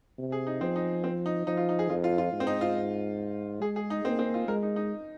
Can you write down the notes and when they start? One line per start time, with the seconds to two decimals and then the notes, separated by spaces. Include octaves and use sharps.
0.18 C3
0.32 G#4
0.47 D#4
0.61 F3 C4
0.76 D#4
1.04 C4
1.26 D#4
1.47 F3 D#4
1.57 F4
1.69 D#4
1.79 G#4
1.89 F2 F4
2.04 F4
2.18 F4
2.33 G#2
2.40 C4
2.47 D#4
2.61 F4
3.61 G#3 G#4
3.76 G#4
3.90 D#4
4.05 A#3 C4
4.19 C4
4.34 F4
4.48 G#3 A#4
4.62 D#4
4.76 D#4